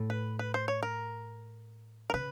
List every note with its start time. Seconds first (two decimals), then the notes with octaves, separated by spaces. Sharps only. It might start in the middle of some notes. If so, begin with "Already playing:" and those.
Already playing: A2
0.10 B4
0.39 B4
0.54 C5
0.68 C#5
0.83 A#4
2.10 A#4
2.14 C#3 B4